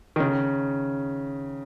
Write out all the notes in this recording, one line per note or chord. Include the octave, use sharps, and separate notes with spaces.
D#3
C#3